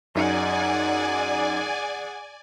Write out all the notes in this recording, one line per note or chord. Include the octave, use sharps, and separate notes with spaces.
F#2 D#4 G#4 D5 F#5 G#5 C#7